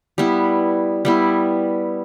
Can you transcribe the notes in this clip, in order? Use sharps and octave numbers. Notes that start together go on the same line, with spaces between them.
G3 B3 E4
G3 B3 E4